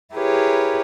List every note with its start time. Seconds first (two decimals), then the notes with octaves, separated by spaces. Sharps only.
0.14 E4 G4 G#4 A#4 B4 C#5